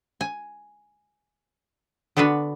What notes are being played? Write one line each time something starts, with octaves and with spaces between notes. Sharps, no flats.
G#5
D3 B3 D4 F#4 B4